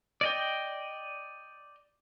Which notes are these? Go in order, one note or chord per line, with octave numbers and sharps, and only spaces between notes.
D5 D#5 G5